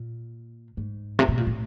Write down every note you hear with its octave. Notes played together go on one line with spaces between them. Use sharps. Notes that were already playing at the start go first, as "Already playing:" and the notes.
Already playing: A#2
G#2
C3
B2
A#2
A2